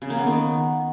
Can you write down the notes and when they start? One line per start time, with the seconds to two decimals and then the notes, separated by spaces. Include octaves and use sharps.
0.02 C#3
0.10 A#3
0.18 B3
0.27 D#3